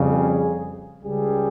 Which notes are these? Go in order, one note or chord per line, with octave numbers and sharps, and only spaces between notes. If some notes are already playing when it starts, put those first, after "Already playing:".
Already playing: F2 C#3 G3
G#4
C#2 C#3 G3 G#4